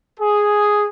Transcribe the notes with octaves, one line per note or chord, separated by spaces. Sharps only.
G#4